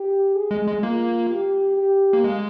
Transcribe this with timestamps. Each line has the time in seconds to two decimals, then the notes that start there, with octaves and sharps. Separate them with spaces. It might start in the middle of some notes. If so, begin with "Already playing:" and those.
Already playing: G4
0.35 G#4
0.51 G#3
0.67 G#3
0.83 A#3 F4
1.30 G4
1.78 G4
2.13 A#3
2.24 G#3